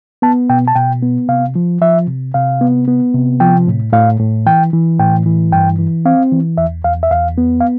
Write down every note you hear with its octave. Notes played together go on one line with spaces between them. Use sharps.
B3 A5
B2 G5
A5
B2 G5
B3
C3 F5
F3
F3 E5
C3
C3 F5
B3
B3
C3
F3 G5
A2
A2 F5
A2
E3 G5
E3
A2 G5
E3
G2 G5
E3
C4 F5
E3
E2 E5
E2 F5
E5
E2 F5
B3
F5